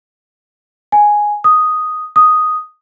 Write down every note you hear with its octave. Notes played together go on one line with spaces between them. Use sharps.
G#5
D#6
D#6